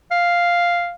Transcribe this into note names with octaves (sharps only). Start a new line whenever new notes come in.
F5